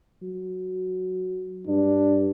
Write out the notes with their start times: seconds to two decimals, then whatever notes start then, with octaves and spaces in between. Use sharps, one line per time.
0.22 F#3
1.67 G2 D4